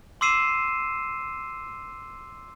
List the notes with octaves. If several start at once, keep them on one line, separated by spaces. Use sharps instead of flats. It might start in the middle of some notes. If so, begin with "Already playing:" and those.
C6 D6 E6 C7 D#7 E7